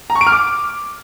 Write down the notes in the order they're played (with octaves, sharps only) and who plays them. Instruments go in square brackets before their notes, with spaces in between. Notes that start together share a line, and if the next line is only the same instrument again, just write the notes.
[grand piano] A#5
C#6
D7
F6
D6